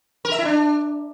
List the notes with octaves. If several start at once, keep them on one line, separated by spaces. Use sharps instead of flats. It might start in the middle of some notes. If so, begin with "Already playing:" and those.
A#4
E5
E4
D4